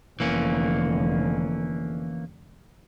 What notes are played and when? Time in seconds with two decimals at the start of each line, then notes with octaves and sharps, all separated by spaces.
0.20 F1 D3 E3 A#3 C#4